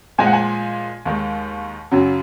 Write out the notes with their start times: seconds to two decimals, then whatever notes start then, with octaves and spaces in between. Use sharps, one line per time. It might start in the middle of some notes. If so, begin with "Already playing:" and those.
0.18 A#2 F3 G#3 G#5
0.26 F#5
0.33 G#5
1.05 D#2 D#3 G#3
1.91 F#2 C#3 F#3